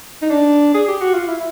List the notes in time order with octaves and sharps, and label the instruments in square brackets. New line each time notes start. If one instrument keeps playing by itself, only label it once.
[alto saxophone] D#4
D4
G#4
G4
F#4
F4
E4